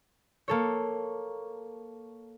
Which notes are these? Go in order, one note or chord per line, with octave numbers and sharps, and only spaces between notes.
A#3 A4 C#5